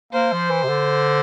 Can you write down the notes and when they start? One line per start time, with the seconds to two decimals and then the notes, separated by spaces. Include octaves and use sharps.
0.13 A#3 C5
0.32 F3
0.50 E3
0.64 C3
0.69 D3